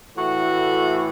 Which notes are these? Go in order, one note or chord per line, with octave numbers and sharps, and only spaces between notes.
A2 E3 A3 F#4